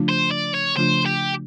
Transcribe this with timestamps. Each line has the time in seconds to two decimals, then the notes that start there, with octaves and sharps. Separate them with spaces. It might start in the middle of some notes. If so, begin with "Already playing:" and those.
Already playing: C#3 F3 A3 D4 F4
0.09 C5
0.31 D5
0.54 C#5
0.76 C#3 F3 A3 D4 F4 C5
1.06 G4